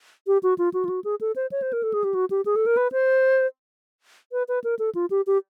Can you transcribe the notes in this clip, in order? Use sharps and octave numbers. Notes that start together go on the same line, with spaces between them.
G4
F#4
F4
F#4
F4
F#4
G#4
A4
C5
C#5
C5
A#4
A4
G#4
G4
F#4
G4
G#4
A4
A#4
B4
C5
B4
B4
A#4
A4
F4
G4
G4